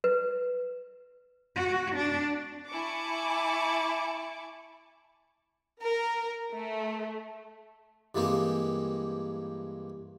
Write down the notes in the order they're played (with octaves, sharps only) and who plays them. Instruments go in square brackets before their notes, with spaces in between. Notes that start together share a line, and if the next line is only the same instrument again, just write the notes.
[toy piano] B4
[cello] F#4
D4
[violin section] E4 G#5 A5 C#6 D6
A#4
A3
[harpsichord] G2 E3 G#3 A#3 C4 G4